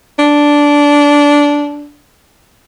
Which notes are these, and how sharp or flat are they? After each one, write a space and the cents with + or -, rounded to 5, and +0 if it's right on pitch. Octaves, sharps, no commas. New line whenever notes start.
D4 -15